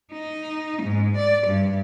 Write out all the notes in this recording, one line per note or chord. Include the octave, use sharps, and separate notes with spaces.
D#4
G#2
D5
G2